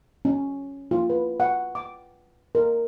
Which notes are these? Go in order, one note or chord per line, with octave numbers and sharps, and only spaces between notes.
C#4
F4
B4
F#5
D6
A#4